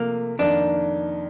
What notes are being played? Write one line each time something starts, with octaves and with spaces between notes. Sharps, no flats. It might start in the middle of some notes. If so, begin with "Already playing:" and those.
Already playing: C3 F3 A3 A#3
F2 D#3 A#3 D4 D#4